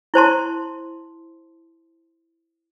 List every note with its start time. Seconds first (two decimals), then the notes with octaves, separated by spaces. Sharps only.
0.14 E4 C5 A5 C6